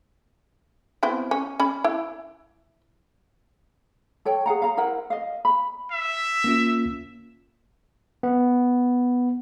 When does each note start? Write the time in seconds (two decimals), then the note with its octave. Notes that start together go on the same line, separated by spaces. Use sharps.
1.03 B3 C4 E4
1.31 C#4
1.60 C#4 B5
1.84 E4
4.25 A4 C#5 G5
4.46 G#4 F5 F#5 A#5
4.62 F5 A#5
4.77 E4 A#4 C5 F#5
5.10 D#5 F5
5.45 B5
5.91 E5
6.44 A#3 C#4 F4
8.23 B3